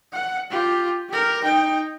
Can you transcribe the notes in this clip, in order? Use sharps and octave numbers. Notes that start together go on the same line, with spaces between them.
F#5
F4 G4
G4 A#4
D#4 G5